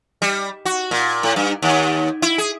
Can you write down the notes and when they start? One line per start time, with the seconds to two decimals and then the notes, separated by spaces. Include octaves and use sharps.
0.22 G3
0.65 F#4
0.91 A#2
1.23 A2
1.36 G2
1.62 D#2
2.22 E4
2.38 G#4